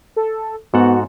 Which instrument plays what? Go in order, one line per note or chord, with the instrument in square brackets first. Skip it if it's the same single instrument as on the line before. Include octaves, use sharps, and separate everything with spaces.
[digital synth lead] A4
[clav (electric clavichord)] G#2 A4 F#5 [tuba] B3 [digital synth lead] F#4